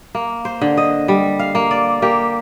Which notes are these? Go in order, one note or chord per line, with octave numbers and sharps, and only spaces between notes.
A#3
C5
D3
D#5
G3
F5
A#3
D5
A#3 G4